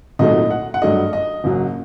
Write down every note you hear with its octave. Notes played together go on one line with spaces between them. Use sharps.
C2 A#2 F#3 A3 D#4 D#5
F#5
F#5
G2 F#3 A3 D4 D#5
D#5
F#1 F#2 F#3